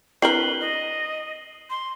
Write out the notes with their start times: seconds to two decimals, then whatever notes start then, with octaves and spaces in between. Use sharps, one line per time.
0.22 C4 D4 E4 A#4 B4 C7 F#7 G7
0.61 D#5
1.70 C6